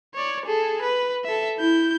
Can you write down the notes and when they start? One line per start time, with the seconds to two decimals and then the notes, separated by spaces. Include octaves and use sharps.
0.15 C#5 D5
0.45 G#4 A4
0.82 B4
1.25 A4 E5
1.58 E4 G6